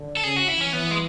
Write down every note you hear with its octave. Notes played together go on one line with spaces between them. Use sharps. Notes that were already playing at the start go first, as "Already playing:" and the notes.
Already playing: D3
A4
C#3 G#4
F#4
E4
E3 C#4
E3 B3
G#3